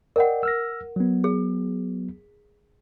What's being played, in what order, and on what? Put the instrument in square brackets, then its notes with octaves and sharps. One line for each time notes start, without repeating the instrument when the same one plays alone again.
[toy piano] A#4 F#5 [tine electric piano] D5 D#5 G5
[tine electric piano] E6 F6 A#6
F#3 B3
[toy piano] G#4